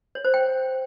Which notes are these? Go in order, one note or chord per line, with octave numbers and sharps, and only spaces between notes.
C#5
C5
G5